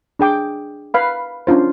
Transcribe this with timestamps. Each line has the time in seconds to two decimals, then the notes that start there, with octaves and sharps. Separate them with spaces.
0.19 D4 G#4 G5 D6
0.94 B4 F5 B5
1.47 C#4 D4 F4 C5